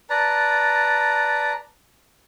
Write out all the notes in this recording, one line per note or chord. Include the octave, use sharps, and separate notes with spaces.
B4 D5 A5 A#5